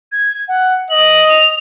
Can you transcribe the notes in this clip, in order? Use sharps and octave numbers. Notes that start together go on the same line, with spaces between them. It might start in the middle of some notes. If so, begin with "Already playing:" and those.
G#6
F#5
D#5 F#7
F7